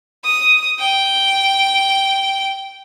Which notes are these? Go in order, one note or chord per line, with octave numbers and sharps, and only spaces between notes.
D#6
G5